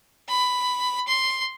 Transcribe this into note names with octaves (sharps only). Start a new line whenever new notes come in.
B5
C6